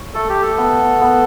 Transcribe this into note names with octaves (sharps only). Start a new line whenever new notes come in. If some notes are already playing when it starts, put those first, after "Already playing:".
Already playing: C#5
A3 A4
G4
A4
B3
B3